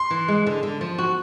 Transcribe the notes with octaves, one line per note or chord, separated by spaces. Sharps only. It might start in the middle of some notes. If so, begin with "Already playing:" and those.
Already playing: C6
E3
G#3
D3
D3
F3
F#4